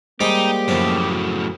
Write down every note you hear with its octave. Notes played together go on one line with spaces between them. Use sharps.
G3 G#3 A#3 C4 D#4 G4
F#2 A2 C#3 F3
F#4